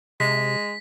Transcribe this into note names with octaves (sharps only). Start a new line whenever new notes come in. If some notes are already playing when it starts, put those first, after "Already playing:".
C3 G#3 B6